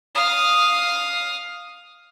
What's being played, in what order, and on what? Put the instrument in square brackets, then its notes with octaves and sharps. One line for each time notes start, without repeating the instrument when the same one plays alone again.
[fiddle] F5 D#6